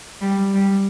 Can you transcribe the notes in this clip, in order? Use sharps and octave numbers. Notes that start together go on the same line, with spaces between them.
G3
G3